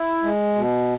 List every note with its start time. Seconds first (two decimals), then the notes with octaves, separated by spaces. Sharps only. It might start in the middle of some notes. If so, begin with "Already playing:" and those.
Already playing: E4
0.23 G#3
0.56 B2